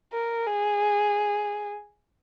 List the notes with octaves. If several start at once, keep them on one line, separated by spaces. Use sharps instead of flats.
A#4
G#4